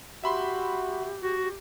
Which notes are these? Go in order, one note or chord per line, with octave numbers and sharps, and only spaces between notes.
F#4 G4 E5 B5 C6
F#4